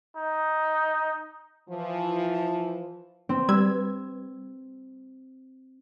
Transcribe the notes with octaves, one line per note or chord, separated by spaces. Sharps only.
D#4
E3 F3
C4
G3 B4 E6 G#6